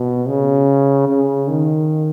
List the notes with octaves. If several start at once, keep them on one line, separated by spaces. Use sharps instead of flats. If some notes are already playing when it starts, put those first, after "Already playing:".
Already playing: B2
C#3
C#3
D#3